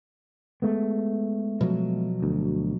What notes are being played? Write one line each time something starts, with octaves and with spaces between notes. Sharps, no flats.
G#3 A3 B3
B2 F3 F#3
D2